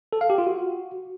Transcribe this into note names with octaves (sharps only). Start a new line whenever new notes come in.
A4
F5
G4
F4
F#4